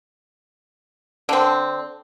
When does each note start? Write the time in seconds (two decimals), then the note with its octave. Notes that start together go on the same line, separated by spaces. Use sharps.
1.29 D3 C4